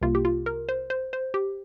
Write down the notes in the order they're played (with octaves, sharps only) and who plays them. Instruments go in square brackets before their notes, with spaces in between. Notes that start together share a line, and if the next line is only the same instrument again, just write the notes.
[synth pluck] C2 C3 A#3 F4
G4
F4
A#4
C5
C5
C5
G4